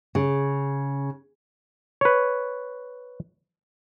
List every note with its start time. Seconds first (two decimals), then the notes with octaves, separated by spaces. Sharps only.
0.15 C#3
2.01 B4 C#5